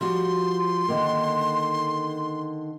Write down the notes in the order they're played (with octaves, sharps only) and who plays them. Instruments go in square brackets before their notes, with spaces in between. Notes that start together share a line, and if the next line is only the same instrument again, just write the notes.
[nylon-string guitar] F3 G3 F#4 [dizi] C6
[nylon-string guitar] D3 D#3 A#3